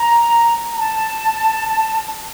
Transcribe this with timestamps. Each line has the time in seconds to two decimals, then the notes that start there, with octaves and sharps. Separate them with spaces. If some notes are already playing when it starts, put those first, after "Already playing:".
Already playing: A#5
0.73 A#5
0.79 A5